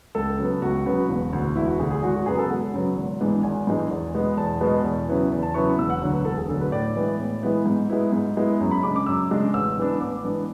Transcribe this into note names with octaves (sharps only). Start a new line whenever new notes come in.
C#2 A4
C#3 F#3 B3
C#2 F#4
C#3 F#3 B3
E1
D2 D3
E1 E4
F#4
D2 D3 G#4
G#4
G#1 F#4
F#4
F#2 C#3 F#3 B3 G#4
A4
G#1 F#5
F#2 C#3 F#3 B3
G#1
G#2 E3 G#3 D4
G#1 G#5
G#2 E3 G#3 D4
E2
B2 G#3 B3
E2 A5
B2 G#3 B3
E2
C#3 F#3 B3 E4
E2
A5
C#3 F#3 B3 E4 C#6
E1 E6
F#5
D2 D3 F#3 C#5
B4
E1 A4
G#4
D2 D3 F#3 A4
B4
A2 D5
E3 G#3 B3 E4
A2
E3 G#3 B3 E4
G#2
G#3 B3 E4
G#2
G#3 B3 E4
F#2
B5
C#3 G#3 D4 D6
D6
F#2 E6
C#3 G#3 D4
A1 E6
G#2 E3 B3 D4
A1 D6
G#2 E3 B3 D4